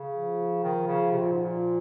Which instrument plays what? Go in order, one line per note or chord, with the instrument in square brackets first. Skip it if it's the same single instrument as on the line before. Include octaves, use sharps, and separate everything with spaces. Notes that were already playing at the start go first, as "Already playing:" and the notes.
Already playing: [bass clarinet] C#3
[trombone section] F3
[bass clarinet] D#3
C#3
C3
A#2
G#2
A#2